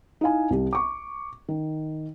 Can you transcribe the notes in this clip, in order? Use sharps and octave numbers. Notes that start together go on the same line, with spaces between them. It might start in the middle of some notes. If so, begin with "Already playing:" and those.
D#4 E4 F5 G#5
C2 G4
C#6 D6
D#3